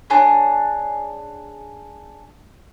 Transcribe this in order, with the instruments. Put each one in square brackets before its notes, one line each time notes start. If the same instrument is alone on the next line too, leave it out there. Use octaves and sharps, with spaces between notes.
[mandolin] D4 G#4 C#5